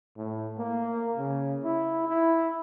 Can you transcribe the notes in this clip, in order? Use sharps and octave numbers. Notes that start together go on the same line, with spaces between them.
A2
A#3
C#3
E4
E4